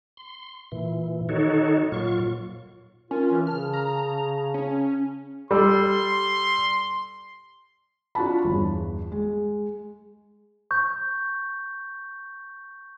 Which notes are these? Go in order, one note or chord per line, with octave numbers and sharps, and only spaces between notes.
C6
A#2 E3
D#3 D#4 F#4 A4 C#5
A#2 F#3 F4 C#6
C#4 F4 A#4
E3
C#3 A5 F6
A#5
C#4
G3 A4 C6
D4 F4 F#4 A5 B5
G1 E2
G#3
C#6 G6